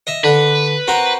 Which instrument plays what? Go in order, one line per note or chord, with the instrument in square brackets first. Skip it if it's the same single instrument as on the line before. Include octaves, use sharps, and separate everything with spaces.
[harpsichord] D#5 E5
[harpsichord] D3 [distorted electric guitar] B4
[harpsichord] C4 F#4 A#4